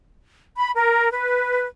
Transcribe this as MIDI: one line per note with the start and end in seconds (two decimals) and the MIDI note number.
0.58 0.70 83
0.75 1.11 70
1.11 1.64 71